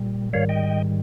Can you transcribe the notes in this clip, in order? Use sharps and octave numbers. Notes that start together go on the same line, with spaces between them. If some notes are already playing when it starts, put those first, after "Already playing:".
Already playing: A#2 G3
G#2 D#3 G3 C#5 F5
D#5 G5